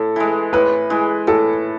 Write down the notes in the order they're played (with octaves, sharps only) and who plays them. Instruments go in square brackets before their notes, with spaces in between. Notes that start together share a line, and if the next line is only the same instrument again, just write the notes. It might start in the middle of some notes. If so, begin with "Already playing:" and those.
Already playing: [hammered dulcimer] A2 [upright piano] A4
[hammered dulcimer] E3 G#3
[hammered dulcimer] A2 [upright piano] B4
[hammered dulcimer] E3 G#3
[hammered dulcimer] A2 [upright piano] A4